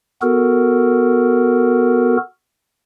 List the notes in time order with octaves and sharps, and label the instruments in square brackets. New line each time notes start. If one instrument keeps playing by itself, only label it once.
[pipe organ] B3 F#4 A4 A#4